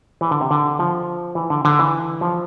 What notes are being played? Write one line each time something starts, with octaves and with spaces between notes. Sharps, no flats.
E3
D3
C3
D3
F3
E3
D3
D3
E3
F3